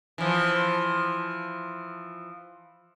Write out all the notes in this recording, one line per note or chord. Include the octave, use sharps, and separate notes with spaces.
E3 F3